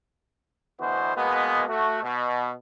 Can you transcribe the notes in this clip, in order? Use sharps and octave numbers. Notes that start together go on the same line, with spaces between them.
D2 B2 E3 B3 F#4 C5
B2 G#3 A#3 B3
A3 F#4
B2